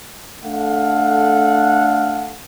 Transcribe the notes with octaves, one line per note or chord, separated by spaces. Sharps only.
A3 D4 A4 F5 F#5